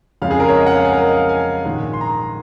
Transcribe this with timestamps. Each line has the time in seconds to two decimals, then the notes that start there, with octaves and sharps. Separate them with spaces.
0.22 F2 C#3 G#3 C#4 F5
0.31 G#4
0.40 A#4
0.49 C#5
0.57 D#5
0.67 F#5
0.76 F5
0.85 G#5
0.93 A#4
1.05 D#5
1.17 F5
1.29 G#5
1.65 A#1 G#2 D#3 G#3 D#4
1.94 C6
2.01 A#5